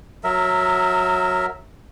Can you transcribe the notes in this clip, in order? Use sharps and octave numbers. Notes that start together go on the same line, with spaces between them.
F#3 A#4 E5